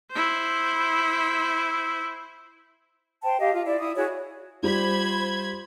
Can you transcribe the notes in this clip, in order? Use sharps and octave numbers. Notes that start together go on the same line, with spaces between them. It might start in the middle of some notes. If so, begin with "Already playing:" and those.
E4 C5
C5 G5 A5
G4 D#5 F5
F4
E4 D5
E4 D#6
E4 F#4 G#4 C#5
G3 F4 C5 B5 G#6